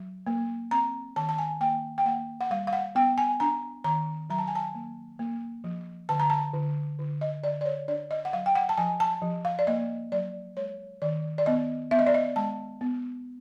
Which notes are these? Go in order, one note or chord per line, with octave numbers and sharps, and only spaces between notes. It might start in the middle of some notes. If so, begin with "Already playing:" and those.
Already playing: F#3
A#3
C4 A#5
D#3 A5
A5
G#5
A#3 G5
G5
A#3 F#5
F#5
G3 F5
F5
F#5
B3 G5
G#5
D4 A#5
D#3 A#5
F#3 A#5
A5
G#5
A5
A#3
A#3
F3
D3 A5
A#5
A5
D3
D3
D#5
D3 D5
D5
C#5
D4 D5
D#5
F#5
F#3 F5
G5
F#5
A5
F3 G#5
A5
F3
F5
D5
A#3 D#5
F#3 D5
G#3 C#5
D#3 D5
D5
B3 D#5
B3 E5
D#5
D5
D#5
G#3 A5
B3